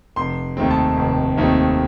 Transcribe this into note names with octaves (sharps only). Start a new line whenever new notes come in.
F1 C6
D#2 D#3 A3 C4
A5
F1
D#2 D#3 A3 C4